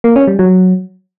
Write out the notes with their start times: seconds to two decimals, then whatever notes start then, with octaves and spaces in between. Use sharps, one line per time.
0.04 A#3
0.16 C#4
0.27 G3
0.39 F#3